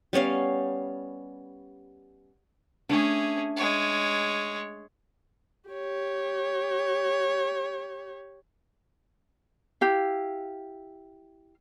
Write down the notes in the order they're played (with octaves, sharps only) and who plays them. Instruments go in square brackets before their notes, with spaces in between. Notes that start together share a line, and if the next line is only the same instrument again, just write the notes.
[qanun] G3 B3 C#4 F5
[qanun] A3 D4 [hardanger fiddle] C#4 G#4
[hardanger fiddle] G#3 C#5
[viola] G4 C#5
[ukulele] E4 G4 F5